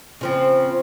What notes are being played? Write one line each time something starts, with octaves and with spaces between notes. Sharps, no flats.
C#3 F3 C4